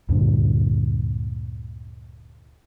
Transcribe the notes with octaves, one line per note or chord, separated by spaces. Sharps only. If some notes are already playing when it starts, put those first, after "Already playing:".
D2 G2 A#2 D3